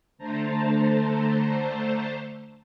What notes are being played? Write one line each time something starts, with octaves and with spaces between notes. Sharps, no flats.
D3 A3 C5 A5 A#5